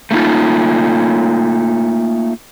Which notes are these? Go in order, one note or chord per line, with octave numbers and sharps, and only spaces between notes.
A3 A#3 D#4 F4